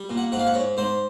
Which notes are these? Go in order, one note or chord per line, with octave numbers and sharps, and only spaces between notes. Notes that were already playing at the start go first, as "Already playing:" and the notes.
Already playing: G3
A#2
F#5
G#2 F#5
F5
F#5
G#2 C#5
G#2 C5